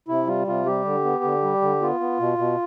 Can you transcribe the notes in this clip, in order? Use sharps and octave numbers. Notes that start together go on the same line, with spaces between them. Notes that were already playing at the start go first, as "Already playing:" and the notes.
C3 E4
G3 F4
C3 F4
G3 G4
D3
B3
D3
G3
D3
B3 F4
B3
B2
B2